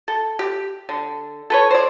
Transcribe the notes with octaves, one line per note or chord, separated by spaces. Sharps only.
A4
G4
D3
A4 B4 C#5
C5 D5